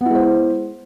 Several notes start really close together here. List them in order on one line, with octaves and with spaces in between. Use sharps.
B3 E4 G#3 C5